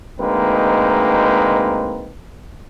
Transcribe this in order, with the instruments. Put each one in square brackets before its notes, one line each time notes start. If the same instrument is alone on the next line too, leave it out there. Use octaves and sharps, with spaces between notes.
[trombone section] D2 G#3 A#3 C4 D#4 B4